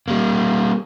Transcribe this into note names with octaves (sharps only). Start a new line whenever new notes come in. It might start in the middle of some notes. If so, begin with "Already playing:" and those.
G3 A#3